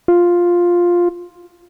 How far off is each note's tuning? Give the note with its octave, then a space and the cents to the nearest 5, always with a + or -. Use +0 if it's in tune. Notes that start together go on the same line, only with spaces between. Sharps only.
F4 +5